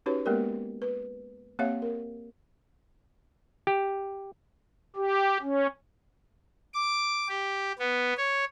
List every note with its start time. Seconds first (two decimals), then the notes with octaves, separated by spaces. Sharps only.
0.06 C#4 D#4 F#4 G4 B4 C#5
0.25 G#3 A#3 B3 G4 A#4 D5
0.82 B4
1.59 A#3 C4 G4 C#5 E5 F5
1.82 A#4
3.67 G4
4.96 G4
5.42 C#4
6.74 D6
7.29 G4
7.79 B3
8.17 C#5